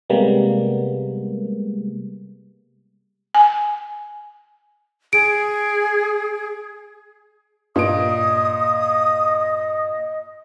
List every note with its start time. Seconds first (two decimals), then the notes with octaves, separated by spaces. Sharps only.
0.10 C3 G3 G#3 A#3 B3
3.34 G#5
5.13 G#4 D7
7.76 G2 A#2 D#5 D#6 D7